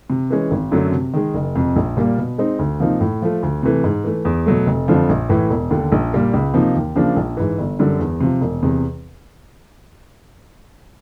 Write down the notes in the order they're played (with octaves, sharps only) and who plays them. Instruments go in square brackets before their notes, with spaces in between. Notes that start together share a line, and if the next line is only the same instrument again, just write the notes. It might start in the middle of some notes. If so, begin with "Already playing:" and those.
[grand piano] C3
E3 G#3 C#4
G#1
F#2 D3 F#3 A3
C3
D#3 G#3
F#1
F2 C3
A#1
A#2 G3 A#3
B2
G#3 C4 D#4
D2
C3 F3 A#3 D#4
A2
F3 A3
D2
C3 E3 A3
G#2
E3 A3
E2
B2 F#3 A3
F1
F2 D3 F3
A#1
A2 E3
E1
D#2 D3
A#1
A#2 G3 A#3
C#2
C3 F3 A#3 D#4
D#2
C#3 F3 A#3 D4
A#1
G#2 E3
G1
F#2 D3 G3
E2
C3 F3
E1
E2 C3